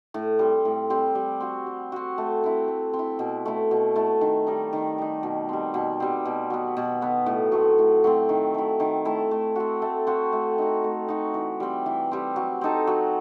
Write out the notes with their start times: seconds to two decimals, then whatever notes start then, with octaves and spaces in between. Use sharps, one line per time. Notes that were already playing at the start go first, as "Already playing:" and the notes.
0.14 A2
0.39 G3 C4
0.65 A2
0.90 G3 C4
1.15 G3
1.41 C4 F#4
1.67 G3
1.92 C4 F#4
2.18 A3
2.44 C4 E4
2.68 A3
2.93 C4
2.99 E4
3.19 B2
3.46 A3 E4
3.71 B2
3.96 A3 E4
4.21 D#3
4.47 G3 D#4
4.73 D#3
4.98 G3 D#4
5.23 B2
5.49 G3 C4
5.74 B2
6.00 G3 C4
6.25 B2
6.50 F#3 B3
6.77 B2
7.01 F#3 B3
7.26 A2
7.52 F#3 A3 C4
7.78 A2
8.04 F#3 A3 C4
8.29 D#3
8.54 A3 E4
8.80 D#3
9.05 A3 E4
9.31 A3
9.56 C4 F#4
9.82 A3
10.07 C4 F#4
10.33 A3
10.58 D#4 F#4
10.84 A3
11.08 D#4 F#4
11.34 E3
11.60 G3 C4
11.86 E3
12.11 G3 C4
12.36 F#3
12.61 C4 D#4 A4
12.87 F#3